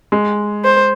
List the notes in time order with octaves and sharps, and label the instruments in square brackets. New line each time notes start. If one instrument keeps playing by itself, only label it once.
[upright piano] G#3
[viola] C5